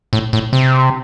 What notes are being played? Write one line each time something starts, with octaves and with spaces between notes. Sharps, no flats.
A2
A2
C3